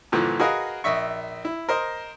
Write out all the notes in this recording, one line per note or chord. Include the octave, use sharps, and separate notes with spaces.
G2 A#2 D3 E3 F3
F#4 G#4 A#4 B4 D#5 F5
A#1 D#5 E5 C#6
E4
A#4 C5 D#5